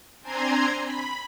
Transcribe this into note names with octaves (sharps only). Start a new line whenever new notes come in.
C4 D4 G#5 A#5 C6 G#6
B5